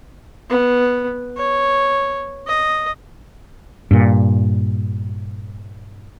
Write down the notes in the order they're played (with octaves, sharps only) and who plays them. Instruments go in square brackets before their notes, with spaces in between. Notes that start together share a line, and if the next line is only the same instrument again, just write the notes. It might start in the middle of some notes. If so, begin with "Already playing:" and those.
[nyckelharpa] B3
C#5
D#5
[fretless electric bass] G2 A#2